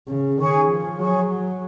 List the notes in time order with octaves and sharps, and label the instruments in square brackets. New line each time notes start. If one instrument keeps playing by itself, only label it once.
[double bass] C#3
[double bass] D#3 [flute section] G#4 C#5 G#5 C#6
[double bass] F3
[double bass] F#3 [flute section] G#4 C#5 G#5 C#6